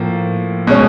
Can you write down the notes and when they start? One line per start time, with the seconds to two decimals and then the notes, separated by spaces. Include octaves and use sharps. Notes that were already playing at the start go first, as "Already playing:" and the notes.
Already playing: A2 F3 A#3
0.67 B2 G#3 C#4